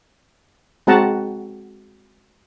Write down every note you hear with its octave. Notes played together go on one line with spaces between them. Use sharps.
G#3 C4 F#4 F#5 A5 A#5